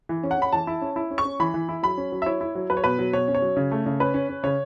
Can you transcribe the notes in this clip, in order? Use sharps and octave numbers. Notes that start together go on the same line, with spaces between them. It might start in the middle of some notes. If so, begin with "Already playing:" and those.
E3
C#4
F#5
C#4 B5
E3 A5
E4
C#4
E4
C#4
C#6
C#4
E3 B5
E3
E4
F#3 B5
C#4
F#3
E5
E4 C#5
E4
F#3
F#3 B4
C#5
B2 B4
F#3
B2 C#5
C#4
C#5
F#3
C#3
A3
C#3
C#4 B4
C#4
C#4
C#3 C#5